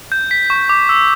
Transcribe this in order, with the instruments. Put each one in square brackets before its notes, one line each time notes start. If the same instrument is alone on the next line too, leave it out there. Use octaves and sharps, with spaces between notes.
[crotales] G6
B6
C#6
D6
E6